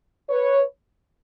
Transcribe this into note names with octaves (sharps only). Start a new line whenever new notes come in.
B4 C#5